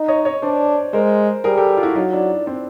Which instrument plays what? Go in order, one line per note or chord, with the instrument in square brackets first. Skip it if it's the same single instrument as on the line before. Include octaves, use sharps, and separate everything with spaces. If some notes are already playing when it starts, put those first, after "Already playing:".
Already playing: [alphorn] D#4
[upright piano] C#5 D#5
C#5 D#5
[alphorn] D4 [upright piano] C5 D5
[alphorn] G#3 [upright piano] A#4 C5
[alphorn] G3 [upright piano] G#4 A#4
[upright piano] G4 A4
F4
E4 F#4
[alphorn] F#3 [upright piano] D#4 F4
[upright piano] D4 E4
C4 D4